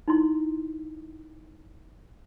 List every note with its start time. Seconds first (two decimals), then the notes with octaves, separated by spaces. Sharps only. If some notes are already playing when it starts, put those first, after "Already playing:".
0.08 D#4 E4 C6